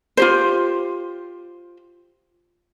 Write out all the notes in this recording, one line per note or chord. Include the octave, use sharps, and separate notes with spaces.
F4 G4 C5